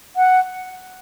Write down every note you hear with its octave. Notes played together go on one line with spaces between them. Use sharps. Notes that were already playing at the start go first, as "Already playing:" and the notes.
F#5